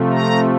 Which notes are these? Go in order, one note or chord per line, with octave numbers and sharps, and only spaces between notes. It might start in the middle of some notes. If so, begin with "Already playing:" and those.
Already playing: C3 F3 A3
A#5